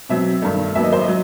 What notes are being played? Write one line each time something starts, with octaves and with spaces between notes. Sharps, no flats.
B2 F#3 C4 E5
G2 D#3 A3
D#2 D#3 F#3 B3 E5
D#5
C5
D#5
F#3